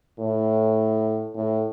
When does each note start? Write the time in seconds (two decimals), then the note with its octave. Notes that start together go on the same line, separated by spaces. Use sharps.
0.19 A2
1.35 A2